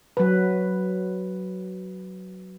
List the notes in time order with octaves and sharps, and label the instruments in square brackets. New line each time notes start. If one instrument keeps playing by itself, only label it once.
[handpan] F#3 B4